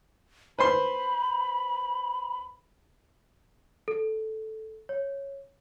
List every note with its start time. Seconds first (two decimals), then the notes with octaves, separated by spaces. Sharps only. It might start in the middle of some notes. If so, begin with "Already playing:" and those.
0.59 B4 C5 B5 C6
3.88 A4
4.89 C#5